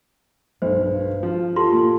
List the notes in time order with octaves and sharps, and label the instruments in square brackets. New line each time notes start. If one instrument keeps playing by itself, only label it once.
[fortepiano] B1 [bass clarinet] G2 [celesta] C5
[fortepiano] F3
[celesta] F4 G4 C6 [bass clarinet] A4
[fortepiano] A#2